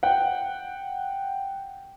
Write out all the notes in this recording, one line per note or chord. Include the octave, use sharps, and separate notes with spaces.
F#5 G5